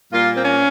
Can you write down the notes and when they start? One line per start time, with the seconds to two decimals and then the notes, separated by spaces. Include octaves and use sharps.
0.12 A#2 G3 A#3 F4
0.35 C4
0.42 C#4